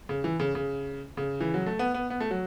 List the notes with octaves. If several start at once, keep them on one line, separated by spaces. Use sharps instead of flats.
C#3
E3
C#3
C#3
C#3
E3
F#3
A3
B3
B3
B3
A3
F#3